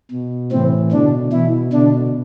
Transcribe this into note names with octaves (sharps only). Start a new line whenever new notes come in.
B2
A2 C3 E3 C4
B2 D3 D4
B2 E3 E4
B2 D3 D4